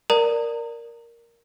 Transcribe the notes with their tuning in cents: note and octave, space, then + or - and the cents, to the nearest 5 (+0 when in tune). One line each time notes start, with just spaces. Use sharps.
A#4 +0 D5 +0 A#5 -35